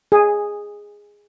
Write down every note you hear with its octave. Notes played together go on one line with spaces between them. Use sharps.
G#4